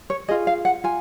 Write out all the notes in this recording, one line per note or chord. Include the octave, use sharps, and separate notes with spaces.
C#5
F4 G#4 D#5
F5
F#5
F4 G#5